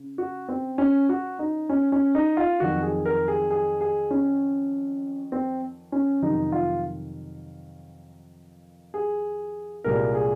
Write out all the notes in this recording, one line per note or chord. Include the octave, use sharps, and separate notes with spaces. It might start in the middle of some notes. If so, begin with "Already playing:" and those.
Already playing: C#3
F#4
C4
C#4
F#4
D#4
C#4
C#4
D#4
F4
F2 D#3 F#3 F#4
G#4
A#4
G#4
G#4
G#4
C#4
C4
C#4
F2 C3 D#3 F#3 D#4
F4
G#4
C2 A#2 G#3 A#4
G#4